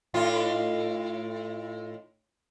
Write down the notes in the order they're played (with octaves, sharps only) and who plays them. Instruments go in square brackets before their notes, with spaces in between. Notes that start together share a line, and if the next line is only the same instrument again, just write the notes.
[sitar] A2 D#4 F4